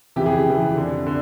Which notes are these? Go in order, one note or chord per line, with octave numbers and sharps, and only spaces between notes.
F2 C#3 E3 G4
G#4
G4
F2 C#3 E3
F2 D3
D3